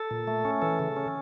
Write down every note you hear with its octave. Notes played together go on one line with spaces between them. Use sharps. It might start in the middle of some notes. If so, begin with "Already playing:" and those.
Already playing: A4
A#2
A3
C#4
E3 A4
C#3
C#4